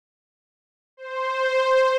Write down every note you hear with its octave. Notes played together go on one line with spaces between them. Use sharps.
C5